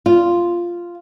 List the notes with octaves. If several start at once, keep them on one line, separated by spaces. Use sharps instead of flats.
F4